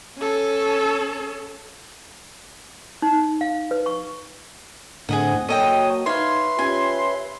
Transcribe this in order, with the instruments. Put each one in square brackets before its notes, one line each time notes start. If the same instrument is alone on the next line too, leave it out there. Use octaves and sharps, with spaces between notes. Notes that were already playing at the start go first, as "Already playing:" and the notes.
[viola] C#4 A4
[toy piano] D#4
F5
B4
C#6
[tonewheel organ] A2 D3 [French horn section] C4 [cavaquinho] G#4 D#5 F#5
[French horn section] F#3 A#3 [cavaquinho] A4 D#5 G5 [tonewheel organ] C#5 D#6
[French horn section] D#4 [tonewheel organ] B4 E5 [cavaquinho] C#5 F5 [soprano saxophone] C6
[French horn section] C#4 F4 G4 [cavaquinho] G#5